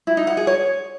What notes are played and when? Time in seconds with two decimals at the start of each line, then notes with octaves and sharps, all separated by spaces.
0.07 E4
0.17 D#4
0.27 F#5
0.37 G#4
0.47 C#5